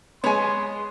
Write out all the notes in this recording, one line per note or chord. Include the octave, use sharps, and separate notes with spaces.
G#3 B3 C#5 G#5 C6